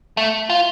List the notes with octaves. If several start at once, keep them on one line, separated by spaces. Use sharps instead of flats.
A3
F4